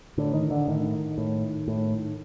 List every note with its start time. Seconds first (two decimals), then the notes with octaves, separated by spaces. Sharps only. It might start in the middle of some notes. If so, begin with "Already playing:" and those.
0.17 A2 D3
0.34 D#3
0.51 D3
0.68 A2 D#3
1.18 A2
1.68 A2